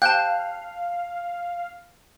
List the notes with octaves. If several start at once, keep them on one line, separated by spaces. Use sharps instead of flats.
F5 G5 A5 F#6